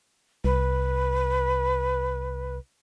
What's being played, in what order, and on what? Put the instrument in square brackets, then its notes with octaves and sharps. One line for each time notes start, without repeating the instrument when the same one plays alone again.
[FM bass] C2 [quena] B4